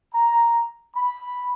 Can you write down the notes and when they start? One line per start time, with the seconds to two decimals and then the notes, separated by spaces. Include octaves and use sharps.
0.12 A#5
0.96 B5